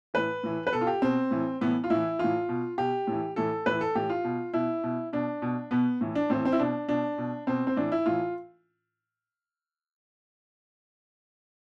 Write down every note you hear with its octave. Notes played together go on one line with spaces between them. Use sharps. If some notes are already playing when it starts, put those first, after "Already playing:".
A2 E3 B4
A2 E3
B4
B2 A4
F4
G4
B2 C4
A2 E3
A2 E3 B3
F4
A2 E3 E4
A2 E3 F4
B2
B2 G4
A2 E3
A2 E3 A4
A2 E3 B4
A4
A2 E3 G4
F4
B2
B2 E4
B2
B2 D4
B2
B2 B3
A2 E3
D4
A2 E3 C4
C4
E4
B2 D4
B2 D4
B2
B2 C4
C4
A2 E3 D4
E4
A2 E3 F4